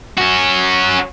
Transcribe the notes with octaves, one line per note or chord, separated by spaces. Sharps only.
C#4 F#4